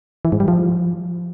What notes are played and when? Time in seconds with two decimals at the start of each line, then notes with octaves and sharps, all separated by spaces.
0.25 E3
0.32 G#2
0.40 G3
0.48 F3